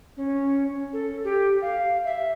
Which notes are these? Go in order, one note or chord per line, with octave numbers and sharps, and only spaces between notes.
C#4
A4
G4
F5
E5